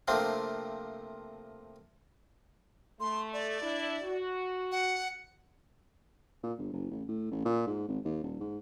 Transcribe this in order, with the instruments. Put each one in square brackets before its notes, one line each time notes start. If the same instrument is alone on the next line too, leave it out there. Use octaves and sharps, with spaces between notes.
[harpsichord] C3 F3 A3 A#3 C4 D4
[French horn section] A3 [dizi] C6
[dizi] D5
[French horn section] D4 E4
F#4
[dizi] F#5
[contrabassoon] A#2
G1
F#1
A1
A2
A1
A#2
G#2
G#1
D#2
D#1
G#2